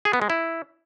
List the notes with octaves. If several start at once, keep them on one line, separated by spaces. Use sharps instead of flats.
G#4
B3
G#3
E4